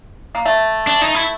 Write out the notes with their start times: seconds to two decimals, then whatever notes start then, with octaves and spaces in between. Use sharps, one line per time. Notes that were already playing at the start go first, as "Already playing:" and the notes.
0.35 A#3
0.45 A3
0.87 D4
1.02 D#4
1.15 E4